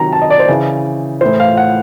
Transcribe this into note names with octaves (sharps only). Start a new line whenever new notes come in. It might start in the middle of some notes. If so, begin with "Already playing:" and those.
Already playing: C3 D#3 F#3 A#5
A5
D#5
D5
C5
C#3 E3
A2 E3 C5
F5
F#5